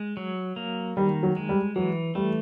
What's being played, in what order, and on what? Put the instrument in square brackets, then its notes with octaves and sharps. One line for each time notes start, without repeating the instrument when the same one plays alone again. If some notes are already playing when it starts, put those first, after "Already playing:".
Already playing: [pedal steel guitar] G#3
F#3
A#3
[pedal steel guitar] D#3 [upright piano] G3
[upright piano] F#3
[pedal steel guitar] G#3
[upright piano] G3
[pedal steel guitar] E3 [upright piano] F#3
[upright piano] G3 [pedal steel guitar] A3